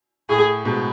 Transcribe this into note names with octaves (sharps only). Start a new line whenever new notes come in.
A2 G#4
G#2 B2